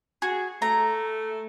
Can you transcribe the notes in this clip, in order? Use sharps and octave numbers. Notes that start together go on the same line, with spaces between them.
F#4 G#4
A3 A#5